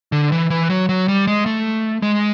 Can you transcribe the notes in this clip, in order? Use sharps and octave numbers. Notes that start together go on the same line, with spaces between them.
D3
E3
E3
F#3
F#3
G3
G#3
A3
G#3